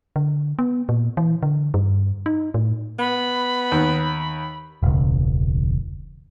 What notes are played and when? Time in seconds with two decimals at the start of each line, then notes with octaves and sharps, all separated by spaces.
0.16 D3
0.59 B3
0.89 A#2
1.17 E3
1.43 D3
1.74 G2
2.26 D#4
2.54 A2
2.99 B3 B5
3.72 D#2
4.83 E1 C#2